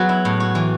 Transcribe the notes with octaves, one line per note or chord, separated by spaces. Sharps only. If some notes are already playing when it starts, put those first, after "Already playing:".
Already playing: F#3 B3 F#4 G#4
E4
A2
F#4
E3